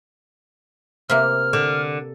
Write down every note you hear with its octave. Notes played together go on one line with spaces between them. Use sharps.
C3 A#3 F6
D3